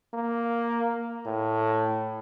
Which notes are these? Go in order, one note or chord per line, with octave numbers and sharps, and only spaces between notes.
A#3
A2